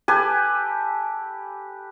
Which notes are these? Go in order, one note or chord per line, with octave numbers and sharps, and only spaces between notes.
G4 A4 B4 G#5